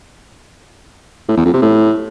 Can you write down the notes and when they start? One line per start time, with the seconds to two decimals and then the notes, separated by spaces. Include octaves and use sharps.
1.29 A2
1.37 E2
1.45 F2
1.54 C3
1.62 A2